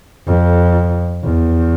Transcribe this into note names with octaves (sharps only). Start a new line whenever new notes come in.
F2
E2